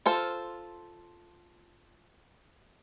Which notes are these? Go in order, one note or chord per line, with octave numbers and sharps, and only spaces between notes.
F4 A4 C5